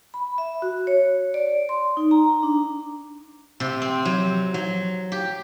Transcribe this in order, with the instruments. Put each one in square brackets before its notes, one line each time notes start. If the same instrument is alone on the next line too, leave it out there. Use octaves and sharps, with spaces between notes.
[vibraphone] B5
E5
F#4
C#5
D5
C6
D#4
A#5
D4
[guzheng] C3
C4
F#3
F#3
G4